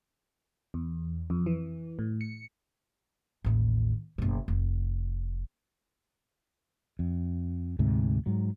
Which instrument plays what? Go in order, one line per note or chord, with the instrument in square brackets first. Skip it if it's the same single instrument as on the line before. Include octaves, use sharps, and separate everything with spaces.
[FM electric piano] E2
F2
E3
A2
C#7
[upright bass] A1 D#2
F#1 B2
F1
[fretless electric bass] F2
D2 G#2 C3
G#2 F#3